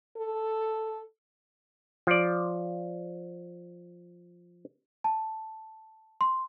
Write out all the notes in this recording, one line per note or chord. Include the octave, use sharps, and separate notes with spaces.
A4
F3 D5
A5
C6